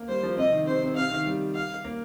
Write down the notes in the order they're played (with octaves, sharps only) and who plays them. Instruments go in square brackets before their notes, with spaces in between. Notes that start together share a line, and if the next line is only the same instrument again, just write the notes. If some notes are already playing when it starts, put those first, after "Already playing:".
Already playing: [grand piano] A#3
[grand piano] G3 [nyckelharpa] C5
[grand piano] F3
[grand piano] C3 [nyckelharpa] D#5
[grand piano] D#3
[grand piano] C3 [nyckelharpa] C5
[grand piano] C3
[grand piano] C3 [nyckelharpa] F5
[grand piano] D#3
G3
[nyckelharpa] F5
[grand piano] A#3